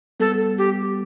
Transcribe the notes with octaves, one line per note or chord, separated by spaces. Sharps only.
G3 B3 A4
G4